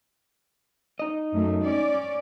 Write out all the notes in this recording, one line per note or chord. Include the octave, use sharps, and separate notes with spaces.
D#4 D#5
F#2 A3
C#4 D5